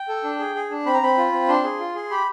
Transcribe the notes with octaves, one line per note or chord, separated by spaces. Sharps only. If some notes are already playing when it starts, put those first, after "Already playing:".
Already playing: G5
A4
D4
G#4
G#4
D4
C4 B5
A#5
C4 B5
F4
C4
D4 C6
G#4
F4
G#4
G4 B5